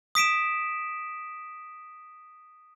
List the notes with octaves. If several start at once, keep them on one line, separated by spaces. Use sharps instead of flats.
D#6 B6 D7 E7